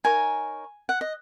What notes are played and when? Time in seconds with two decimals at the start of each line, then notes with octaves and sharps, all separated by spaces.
0.04 D#4 A#4 C#5 G#5
0.89 F#5
1.01 D#5